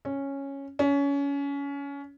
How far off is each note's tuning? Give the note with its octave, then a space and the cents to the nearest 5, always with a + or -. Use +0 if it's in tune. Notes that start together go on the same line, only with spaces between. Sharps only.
C#4 -5
C#4 +25